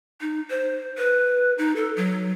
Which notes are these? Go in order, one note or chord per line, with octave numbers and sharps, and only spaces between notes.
D#4
C5
B4
D#4
A4
F#3